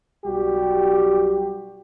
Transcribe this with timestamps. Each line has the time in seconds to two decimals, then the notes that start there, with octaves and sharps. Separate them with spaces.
0.25 B1 G3 F#4 G4